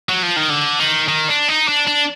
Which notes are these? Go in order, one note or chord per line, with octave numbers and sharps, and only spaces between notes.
F#3
F3
D#3
D3
D#3
D#3
D4
D#4
D4
D4